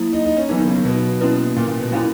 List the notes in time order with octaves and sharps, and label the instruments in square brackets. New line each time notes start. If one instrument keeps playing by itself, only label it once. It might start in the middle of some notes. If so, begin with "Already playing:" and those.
Already playing: [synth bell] F#3 A#3 E4
[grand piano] D#4
D#4
C#4
[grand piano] E3 [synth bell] F#3 B3 D#4
[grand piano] D#3
C#3
D#3
B2
[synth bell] A#3 C#4 E4 B4
[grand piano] A#2
A#2
B2
[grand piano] A#2 [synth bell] F#3 C#4 E4